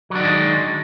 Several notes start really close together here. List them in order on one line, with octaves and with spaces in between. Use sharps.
F#3 D4 D#3 G#3